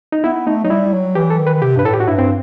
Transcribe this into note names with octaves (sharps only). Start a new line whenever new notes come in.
D#4
B3 E4
A3 D#4
F#3 D#4
G3 E4
F#3
E3 G4
A4
D#3
B4
C3 G4
G2 B4
A2 A4
G4
F#4
G2 E4
C4